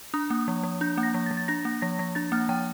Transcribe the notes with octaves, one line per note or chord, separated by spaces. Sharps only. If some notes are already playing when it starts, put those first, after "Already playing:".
D4 D#6
A#3
F3
F3
D4 G6
A#3
A#6
F3
A6
F3
A6
D4 A#6
A#3
F3 A#6
F3
D4 A6
A#3 F6
F3 G5